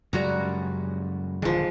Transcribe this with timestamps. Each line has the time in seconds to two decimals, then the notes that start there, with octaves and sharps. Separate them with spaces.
0.13 F#2 C#3 G3 G#3 F#4 A#5
1.42 D#1 D3 F3 G#3